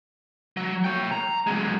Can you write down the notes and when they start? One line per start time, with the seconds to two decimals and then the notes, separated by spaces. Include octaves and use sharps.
0.57 F#3
0.84 C#5 G5
1.12 A#5
1.47 F#3 G#3